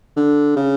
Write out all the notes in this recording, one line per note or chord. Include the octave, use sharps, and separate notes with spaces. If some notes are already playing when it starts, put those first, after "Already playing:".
D3
C#3